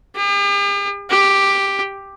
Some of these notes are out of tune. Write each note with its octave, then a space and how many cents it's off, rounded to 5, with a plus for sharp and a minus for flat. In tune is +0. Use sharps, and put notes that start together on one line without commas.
G4 +45
G4 +5